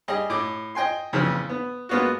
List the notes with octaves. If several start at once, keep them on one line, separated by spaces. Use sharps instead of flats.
G3 G#4 D#5
A2 D6
D#5 G5 G#5 C6
F2 A#2 C#3 E3
B3
G#3 A#3 B3 F4 F#4